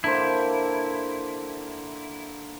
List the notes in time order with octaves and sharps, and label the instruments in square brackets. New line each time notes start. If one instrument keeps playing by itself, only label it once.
[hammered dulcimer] D3 A#3 C5 [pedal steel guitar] E4